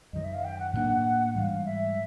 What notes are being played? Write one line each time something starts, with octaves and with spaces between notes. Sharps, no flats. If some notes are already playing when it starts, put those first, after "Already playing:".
F#2 D#3 F#3 D#5
E5
F5
G5
F#5
A2 F#3 A#3 D4 F#5
G#2 E3 G3 F5 F#5
E5